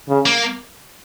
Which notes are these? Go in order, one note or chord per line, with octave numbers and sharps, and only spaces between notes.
C#3
A#3